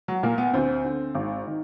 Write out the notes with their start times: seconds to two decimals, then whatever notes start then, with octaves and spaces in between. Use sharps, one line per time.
0.08 F#3
0.23 A#2 A#3
0.38 B3
0.54 D2 C4
0.85 D3
1.15 G#1
1.47 D#3